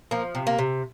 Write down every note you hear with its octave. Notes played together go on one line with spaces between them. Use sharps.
F3 A#3
C3
A#3
C3